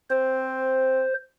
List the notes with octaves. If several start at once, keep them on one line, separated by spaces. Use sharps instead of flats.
C4 C5